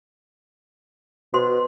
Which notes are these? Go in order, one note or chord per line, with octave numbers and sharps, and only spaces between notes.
B2 F#4 C5 C6